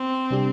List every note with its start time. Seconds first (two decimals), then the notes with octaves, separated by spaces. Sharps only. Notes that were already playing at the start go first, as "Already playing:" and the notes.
Already playing: C4
0.30 C3 G3 D4 G4